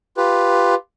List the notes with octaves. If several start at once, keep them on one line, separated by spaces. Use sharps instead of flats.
F4 G4 B4